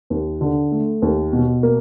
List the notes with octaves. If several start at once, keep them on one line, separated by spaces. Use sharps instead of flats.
D#2
D3
A3
D#2
B2
A#3